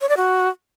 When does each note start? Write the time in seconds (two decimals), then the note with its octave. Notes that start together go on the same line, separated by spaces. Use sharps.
0.01 C#5
0.09 D5
0.17 F#4